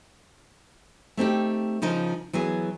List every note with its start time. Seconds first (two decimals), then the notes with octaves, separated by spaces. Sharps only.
1.17 A3 C4 D#4 G4
1.82 C#3 F3 D#4 A#4
2.33 E3 F#3 B3 G#4